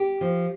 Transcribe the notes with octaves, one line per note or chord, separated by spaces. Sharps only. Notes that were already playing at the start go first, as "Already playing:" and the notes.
Already playing: G4
F3